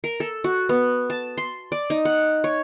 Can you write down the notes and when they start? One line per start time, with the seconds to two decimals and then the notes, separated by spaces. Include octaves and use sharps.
0.04 A#4
0.20 A4
0.44 F#4
0.69 B3
1.10 A5
1.38 C6
1.72 D5
1.90 D#4
2.05 F#5
2.44 C#5